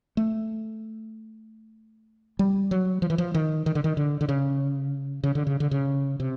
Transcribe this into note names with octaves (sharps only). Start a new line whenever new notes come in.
A3
G3
F#3
F3
E3
F3
D#3
D#3
D3
D#3
D3
D3
C#3
C#3
D3
C#3
D3
C#3
C3